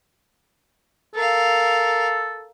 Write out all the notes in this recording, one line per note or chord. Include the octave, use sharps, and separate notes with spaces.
A4 A#4 F5